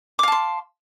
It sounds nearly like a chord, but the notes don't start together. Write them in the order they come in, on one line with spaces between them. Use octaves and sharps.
D6 F5 A5 C6